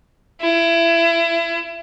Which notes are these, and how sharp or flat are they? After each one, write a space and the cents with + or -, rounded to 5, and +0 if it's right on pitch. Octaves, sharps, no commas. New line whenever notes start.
E4 +25